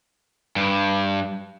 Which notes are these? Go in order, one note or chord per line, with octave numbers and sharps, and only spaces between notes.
G2